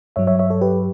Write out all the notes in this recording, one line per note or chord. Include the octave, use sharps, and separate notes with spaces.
G2 F#3 C#5 E5
C#5 E5
C#5 E5
A4 C#5
G4 B4